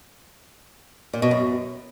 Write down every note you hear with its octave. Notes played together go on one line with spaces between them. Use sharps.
A#2
B2
F#2